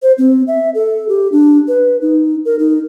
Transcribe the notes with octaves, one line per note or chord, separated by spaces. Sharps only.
C5
C4
E5
A4
G4
D4
B4
D#4
A#4
D#4